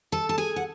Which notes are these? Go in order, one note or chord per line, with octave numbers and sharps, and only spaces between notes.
A4 A5
A5
G#4 G#5
F#5